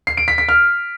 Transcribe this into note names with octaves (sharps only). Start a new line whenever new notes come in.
C7
D7
B6
B6
F6